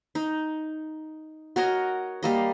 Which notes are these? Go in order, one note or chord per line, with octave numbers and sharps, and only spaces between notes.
D#4
F#4 A#4 C#5 D#5
G3 A#3 D#5